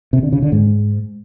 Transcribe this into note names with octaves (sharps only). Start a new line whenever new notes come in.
C3
D3
C#3
D3
G#2